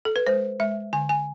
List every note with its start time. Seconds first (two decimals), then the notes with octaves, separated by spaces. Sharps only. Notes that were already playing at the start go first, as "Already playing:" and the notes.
0.05 A4
0.16 B4
0.27 G#3 C5
0.60 G#3 E5
0.93 D3 G#5
1.09 G#5